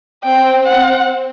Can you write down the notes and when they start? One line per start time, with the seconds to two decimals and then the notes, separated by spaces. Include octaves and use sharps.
0.23 C4 G5
0.67 F#5